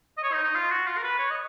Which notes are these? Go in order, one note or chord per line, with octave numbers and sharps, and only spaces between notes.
D#5
C#5
D#4
D#4
F4
F#4
F4
A#4
B4
C#5
D#5